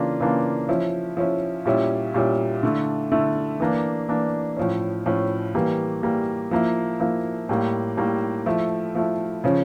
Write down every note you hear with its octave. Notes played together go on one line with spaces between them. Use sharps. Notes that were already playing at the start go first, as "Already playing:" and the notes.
Already playing: C#3 E3 A#3 D4 F4
C#3 E3 A#3 D4 F4
F3 C#4 E4
F3 C#4 E4
A#2 G3 C#4 E4
A#2 G3 C#4 E4
D3 A3 E4
D3 A3 E4
E3 A#3 D4
E3 A#3 D4
A2 F3 C#4
A2 F3 C#4
E3 G3 A#3
E3 G3 A#3
F3 A#3 E4
F3 A#3 E4
A2 G3 A#3
A2 G3 A#3
F3 A3 E4
F3 A3 E4
C#3 F3 C#4